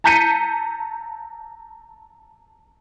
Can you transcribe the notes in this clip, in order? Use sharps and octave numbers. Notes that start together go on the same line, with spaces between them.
A5 A#5 G6 B6 C#7 D#7